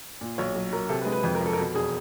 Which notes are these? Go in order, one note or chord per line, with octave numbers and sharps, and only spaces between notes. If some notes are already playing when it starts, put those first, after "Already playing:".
A#2
B1 C#5
F#3
F#3 A#4
C3 A4
B4
G#3
B4
F2 B4
A#4
F2
A4
A#4
B2 A4
E1 G#4